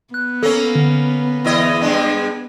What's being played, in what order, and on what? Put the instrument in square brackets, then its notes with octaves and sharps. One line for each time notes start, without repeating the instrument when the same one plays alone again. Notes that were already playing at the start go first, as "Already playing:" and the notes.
[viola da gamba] B3 [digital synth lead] F#6
[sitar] A#3 C#4 [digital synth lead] A4
[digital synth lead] D3
[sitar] E2 E4 D#5
[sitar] G2 G#3 D4 [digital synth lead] G5